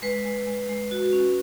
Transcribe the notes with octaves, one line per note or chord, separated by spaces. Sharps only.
G#3 B4
G#3
G#3
G#3
F#4
C#4